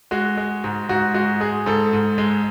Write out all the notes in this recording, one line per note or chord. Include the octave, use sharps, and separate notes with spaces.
G#3 F#4
G#3
G#2
G#2 F#4
G#3 F#4
G#3 G#4
G#2 A4
G#2
G#3